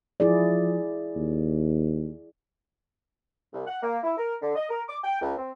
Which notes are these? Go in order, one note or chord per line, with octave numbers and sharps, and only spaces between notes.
F3 E4 G#4 D5
D#2
C2
F#5
A#3
E4
A#4
D3
D#5
A#4
D6
G5
C#2
C4